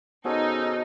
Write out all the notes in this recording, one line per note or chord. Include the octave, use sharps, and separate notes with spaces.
B3 C#4 D#4 F#4 G#4 A4 C5